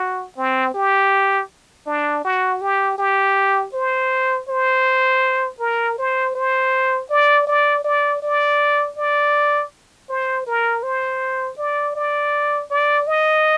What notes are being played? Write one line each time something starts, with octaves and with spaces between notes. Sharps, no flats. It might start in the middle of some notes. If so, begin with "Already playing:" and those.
Already playing: F#4
C4
G4
D4
F#4
G4
G4
C5
C5
A#4
C5
C5
D5
D5
D5
D5
D5
C5
A#4
C5
D5
D5
D5
D#5